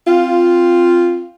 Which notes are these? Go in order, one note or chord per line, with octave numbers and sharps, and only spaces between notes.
C4 F4